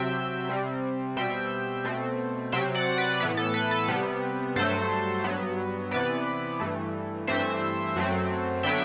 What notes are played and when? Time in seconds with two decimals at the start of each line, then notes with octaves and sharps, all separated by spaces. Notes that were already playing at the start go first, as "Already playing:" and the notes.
Already playing: C3 F#3 C4 E5 G5
0.49 C3 G3 C4
1.16 B2 G3 C4 E5 G5
1.85 B2 A3 C4
2.52 C3 F#3 C4 E5 G5
2.75 D5 F#5
2.98 B4 D5
3.20 A2 E3 B3 B4
3.37 A4
3.54 B4
3.71 A4
3.88 C3 G3 B3
4.56 G2 F#3 A3 A4 C5
5.24 G2 F#3 B3
5.91 C3 E3 B3 B4 D5
6.60 G2 E3 A3
7.27 G2 E3 A3 C4 C5 E5
7.96 F#2 F#3 A3 C4
8.63 D3 F#3 B3 E5 G5